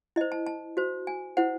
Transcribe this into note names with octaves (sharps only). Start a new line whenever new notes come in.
E4 C5 D#5
A5
A5
F#4 C5
G#5
E4 C5 F#5